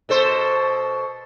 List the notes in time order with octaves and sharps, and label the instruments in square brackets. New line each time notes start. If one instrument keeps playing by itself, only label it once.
[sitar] B2 A4 C5